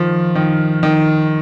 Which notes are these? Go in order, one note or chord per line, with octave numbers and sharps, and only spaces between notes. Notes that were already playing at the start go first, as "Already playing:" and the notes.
Already playing: D#3 F3
D#3
D#3